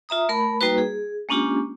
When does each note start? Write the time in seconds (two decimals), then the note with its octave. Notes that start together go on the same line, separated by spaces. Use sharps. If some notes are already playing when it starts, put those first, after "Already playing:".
0.09 F4 E5 A#5 D#6
0.29 A3 A#4 B5
0.61 G3 A#3 D#4 F#4 B4
0.78 G#4
1.29 G#3 A#3 C#4 D4 F4 G4